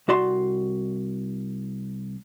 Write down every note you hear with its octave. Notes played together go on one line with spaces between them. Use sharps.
C2 F#4 D5 C6